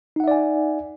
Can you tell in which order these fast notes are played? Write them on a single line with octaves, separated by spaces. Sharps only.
D#4 F#5 E5 D5 G#5